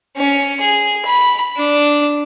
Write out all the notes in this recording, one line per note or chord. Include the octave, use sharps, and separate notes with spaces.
C#4
G#4
B5
D4